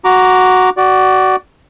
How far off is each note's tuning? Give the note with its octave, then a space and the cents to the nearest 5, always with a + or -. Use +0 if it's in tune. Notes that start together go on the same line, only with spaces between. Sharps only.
F#4 +0 A#5 +0 D6 -15
F#4 +20 D5 +0